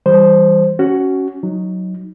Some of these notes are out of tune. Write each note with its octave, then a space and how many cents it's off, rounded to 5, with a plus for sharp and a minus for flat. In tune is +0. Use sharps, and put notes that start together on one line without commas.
E3 -15 G3 -5 C5 +0
C#4 +0 F#4 +15
F#3 +0 D#4 +5